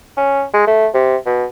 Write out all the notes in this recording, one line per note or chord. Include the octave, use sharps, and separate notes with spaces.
C#4
G#3
A3
C3
B2